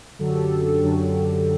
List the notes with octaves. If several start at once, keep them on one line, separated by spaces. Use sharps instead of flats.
F#2 D3 F#3 A4
G4
A4
A4
A4
F#2 D3 F#3